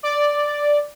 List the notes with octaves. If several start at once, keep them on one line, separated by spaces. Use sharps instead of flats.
D5